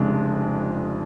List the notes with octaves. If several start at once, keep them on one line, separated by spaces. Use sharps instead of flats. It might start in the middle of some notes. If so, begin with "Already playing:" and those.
Already playing: F1 F2 C#3 G#3 D4